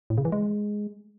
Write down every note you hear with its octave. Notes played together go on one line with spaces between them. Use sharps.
A2
C#3
E3
G#3